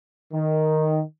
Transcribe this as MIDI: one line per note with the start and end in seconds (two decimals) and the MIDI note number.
0.34 1.01 51